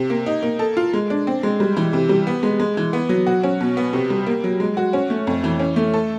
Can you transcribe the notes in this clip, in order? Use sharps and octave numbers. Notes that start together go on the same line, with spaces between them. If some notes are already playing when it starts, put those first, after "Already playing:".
Already playing: C3
A#3
D#4
A#3
A4
F4
G#3
D4
C4
G#3
G3
E3
C3
G3
B3
G#3
G#3
E3
B3
F#3
F#4
C#4
B2
B3
C3
G3
A#3
F#3
G#3
F#4
C#4
A3
F2
E3
C#4
A3
A4